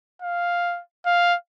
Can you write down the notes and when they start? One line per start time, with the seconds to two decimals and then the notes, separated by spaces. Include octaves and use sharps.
0.22 F5
1.06 F5